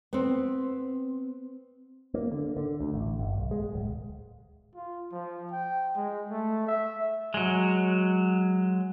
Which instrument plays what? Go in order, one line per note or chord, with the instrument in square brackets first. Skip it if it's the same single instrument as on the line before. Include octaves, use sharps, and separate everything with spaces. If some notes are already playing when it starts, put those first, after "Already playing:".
[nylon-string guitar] B3 C4
[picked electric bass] A#3
D3
D3
D2
A1
G1
B1
G#3
D1
[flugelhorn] F4
F3
G5
G#3
A3
E5
[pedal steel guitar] F#3 G#3